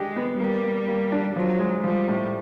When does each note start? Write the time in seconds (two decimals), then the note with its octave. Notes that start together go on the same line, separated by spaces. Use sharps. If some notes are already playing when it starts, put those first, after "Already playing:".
Already playing: G#3 D4 G4
0.16 B3
0.40 G3 A#3
0.63 A#3
0.88 A#3
1.12 D4
1.36 F3 F#3
1.59 G#3
1.83 F3 G3
2.08 A2